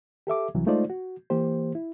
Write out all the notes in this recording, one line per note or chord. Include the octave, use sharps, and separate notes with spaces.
G4 A4 E5 D6
C2 E3 F#3
G#3 A3 D#4 F4 C5 D5
F#4
E3 A#3 G4 C5
E4